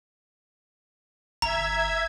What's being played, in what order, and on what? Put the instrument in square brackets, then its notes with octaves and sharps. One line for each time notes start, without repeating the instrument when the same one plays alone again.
[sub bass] G1 [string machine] E5 G#6 [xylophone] A#5